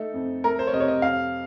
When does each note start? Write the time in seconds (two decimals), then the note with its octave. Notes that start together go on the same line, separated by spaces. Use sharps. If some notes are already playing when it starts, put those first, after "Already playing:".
Already playing: A3 D#4 A4
0.14 F2
0.44 A3 A#4
0.59 C5
0.67 C#5
0.73 C3 D#5
0.80 C#5
0.88 D#5
1.02 F2 F5